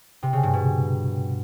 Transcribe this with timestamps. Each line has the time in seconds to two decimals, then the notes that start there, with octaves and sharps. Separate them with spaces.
0.23 C3
0.33 C#3
0.43 G2
0.54 B2